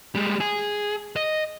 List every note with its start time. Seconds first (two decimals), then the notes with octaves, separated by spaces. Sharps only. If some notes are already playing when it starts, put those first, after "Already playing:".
0.15 G3 G#3
0.40 G#4
1.16 D#5